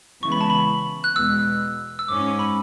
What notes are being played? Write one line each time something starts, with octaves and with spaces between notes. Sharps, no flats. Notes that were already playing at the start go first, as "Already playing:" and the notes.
C#3 E3 G#3 B3 E4 C#6
B5
A5
B5
F#6
E2 B2 G#3 E6
E6
G#2 G#3 C#4 D6
B5